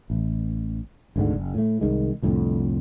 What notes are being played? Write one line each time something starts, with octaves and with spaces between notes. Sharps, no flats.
A1
G#1 D2 G#2 D3
F#1
A2 A3
C2 D#3 G#3
C2 F2 A2 D3